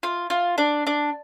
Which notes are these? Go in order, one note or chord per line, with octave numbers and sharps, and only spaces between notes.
F4
F4
D4
D4